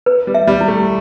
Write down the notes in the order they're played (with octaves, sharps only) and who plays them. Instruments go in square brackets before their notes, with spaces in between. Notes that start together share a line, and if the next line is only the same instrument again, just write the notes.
[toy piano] B4
[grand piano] G3
[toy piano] E5
[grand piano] G3
[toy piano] E4
[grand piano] A3